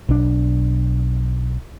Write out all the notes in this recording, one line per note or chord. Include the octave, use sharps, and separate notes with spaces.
B1 D4